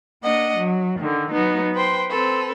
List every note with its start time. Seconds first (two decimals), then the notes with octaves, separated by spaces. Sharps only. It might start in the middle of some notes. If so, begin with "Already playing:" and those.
0.23 A#3 D4 D#5 F#5
0.57 F#3
0.99 D3 D#3
1.31 F#3 B3 D#4
1.74 B4 C5 G5 C6
2.09 C4 A4 B4